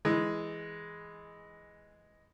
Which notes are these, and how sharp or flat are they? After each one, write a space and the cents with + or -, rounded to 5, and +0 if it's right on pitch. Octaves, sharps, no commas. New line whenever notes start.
E3 +0 G#3 +0